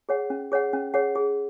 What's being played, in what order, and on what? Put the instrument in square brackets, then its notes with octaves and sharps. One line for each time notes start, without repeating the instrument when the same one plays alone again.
[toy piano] G#4 C#5 F#5
C#4
G#4 C#5 F#5
C#4
G#4 C#5 F#5
G#4